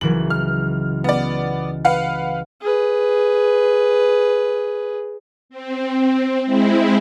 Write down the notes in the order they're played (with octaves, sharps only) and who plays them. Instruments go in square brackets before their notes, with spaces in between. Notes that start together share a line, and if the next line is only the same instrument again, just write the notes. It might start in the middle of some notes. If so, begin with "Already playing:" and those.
[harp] C#2 E3 F#3 [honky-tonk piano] F#7
[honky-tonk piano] F6
B3 D5
B4 F5 F#5
[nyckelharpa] G#4 B4
[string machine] C4
G#3 C4 E4